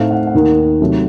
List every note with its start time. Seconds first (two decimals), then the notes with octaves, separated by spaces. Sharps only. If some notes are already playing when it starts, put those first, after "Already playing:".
Already playing: A2 A3 C4 D#4 F5
0.11 F#5
0.27 F#5
0.34 D#2 D#3 A#3 D#4
0.81 C3 F#3 A3 D#4